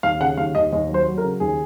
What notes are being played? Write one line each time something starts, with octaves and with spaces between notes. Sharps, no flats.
D#2 F5
C#3 F#5
D#2 F5
D#2 D#5
D#2 D#5
F#3
C5
F#3
A#4
C#3
D#2 G#4